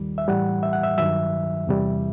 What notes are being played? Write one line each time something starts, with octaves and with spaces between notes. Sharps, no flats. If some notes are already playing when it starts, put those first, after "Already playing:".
Already playing: D#2 D#3 G3
E5
A2 E3 G3 F#5
E5
F#5
E5
G2 D#3 F#3 E5
E2 C3 E3 G3